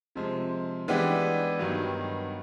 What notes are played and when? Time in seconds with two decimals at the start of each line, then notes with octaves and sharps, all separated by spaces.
0.15 C3 F3 G#3
0.88 E3 G#3 B3 D4 G4
1.59 G2 D#3 F#3 B3